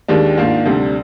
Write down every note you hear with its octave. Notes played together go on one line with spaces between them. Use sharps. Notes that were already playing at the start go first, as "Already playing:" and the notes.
D#2 D#3 G#3 D4 G4
G#2 D#3 A#3 D4 F4
D2 C3 G3 D4